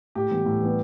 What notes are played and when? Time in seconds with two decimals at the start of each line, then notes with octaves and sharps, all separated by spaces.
0.15 A2 G4
0.31 E3 G3 B3
0.46 A2
0.61 E3 G3 B3